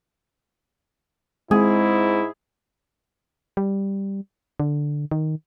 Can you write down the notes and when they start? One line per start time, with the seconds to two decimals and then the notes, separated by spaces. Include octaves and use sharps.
1.51 G#2 G#3 C4 E4 G#4
3.57 G3
4.60 D3
5.11 D#3